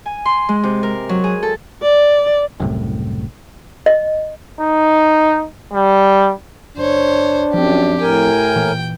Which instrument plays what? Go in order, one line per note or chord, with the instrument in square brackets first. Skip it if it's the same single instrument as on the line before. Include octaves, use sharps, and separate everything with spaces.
[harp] G#5
C6
G#3
C3
A#4
F#3
G#4
A4
[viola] D5
[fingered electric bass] F#1 C2 A2
[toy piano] D#5
[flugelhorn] D#4
G3
[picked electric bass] F#1 [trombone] D4 [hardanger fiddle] C5 C#5
[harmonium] F#2 [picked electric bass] F3 C4 [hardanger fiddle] G4
[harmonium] A2 A#4 G#5 [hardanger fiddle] G5
[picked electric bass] A#2 E3